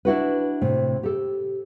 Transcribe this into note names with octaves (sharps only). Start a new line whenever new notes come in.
D4 E4 F#4 B4
A2 C3
G4 A4